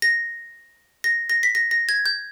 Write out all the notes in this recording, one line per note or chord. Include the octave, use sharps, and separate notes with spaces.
A#6
A#6
A#6
B6
A#6
A#6
G#6
G6